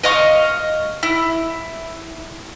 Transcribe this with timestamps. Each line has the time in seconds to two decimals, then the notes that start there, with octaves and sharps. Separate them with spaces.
0.03 D#5 F5 C#6
1.03 E4